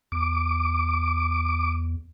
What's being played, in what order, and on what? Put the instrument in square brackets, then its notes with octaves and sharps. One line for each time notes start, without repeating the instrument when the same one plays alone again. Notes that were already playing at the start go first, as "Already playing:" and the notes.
[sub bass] E2 [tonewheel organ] D6